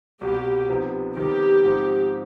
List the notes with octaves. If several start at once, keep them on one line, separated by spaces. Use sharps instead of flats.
C2 B2 G3 G4
C3 F3 B3 D#4
C3 D#3 G3 B3 D#4 G4
G#2 F3 C4 D#4